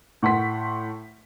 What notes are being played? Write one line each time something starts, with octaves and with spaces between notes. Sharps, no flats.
A2 F#5 C6 B6